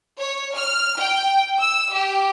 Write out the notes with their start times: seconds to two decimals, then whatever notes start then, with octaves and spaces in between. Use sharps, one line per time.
0.18 C#5
0.55 F6
0.99 G5
1.59 E6
1.93 G4